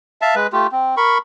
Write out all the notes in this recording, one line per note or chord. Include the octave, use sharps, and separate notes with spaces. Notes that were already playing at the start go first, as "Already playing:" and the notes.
E5 F5 A5
G#3 B4
A3 F4 G4
C4
A#4 B5 C#6